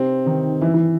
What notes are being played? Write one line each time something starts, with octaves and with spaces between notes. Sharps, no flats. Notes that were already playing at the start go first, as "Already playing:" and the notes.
Already playing: C3 C4
D#3 D#4
E3 E4
E3 E4